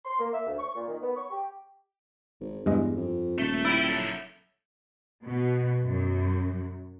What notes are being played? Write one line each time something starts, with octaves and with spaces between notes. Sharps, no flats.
C6
A#3
E5
D2
C#6
A#2
D#3
B3
C#6
G4
G#1
E2 G2 G#3 D#5
F2
D#1 A3
E4 D5 G5
F#3 A4
B2
F#2